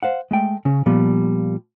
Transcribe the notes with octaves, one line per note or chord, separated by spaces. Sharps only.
C5 F5 F#5
G#3 A3 G5
C#3 C#4
A#2 F3 G3 B3